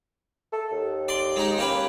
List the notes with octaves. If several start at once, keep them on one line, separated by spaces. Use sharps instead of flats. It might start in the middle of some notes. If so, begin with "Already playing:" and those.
A4
D#2
D5 C6
G#3 D#4
A#3 C#4 G4 B4